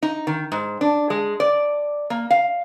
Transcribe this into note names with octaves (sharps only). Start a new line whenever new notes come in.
D#4
D#3
G#2
D4
G#3
D5
A#3
F5